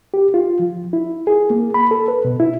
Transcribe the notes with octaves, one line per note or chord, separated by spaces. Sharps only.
G4
F4
F3
E4
G#4
A#3
B5
A4
B4
B2
E4